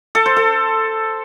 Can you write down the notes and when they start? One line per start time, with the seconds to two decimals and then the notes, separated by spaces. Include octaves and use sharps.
0.15 A4
0.26 C5
0.36 A4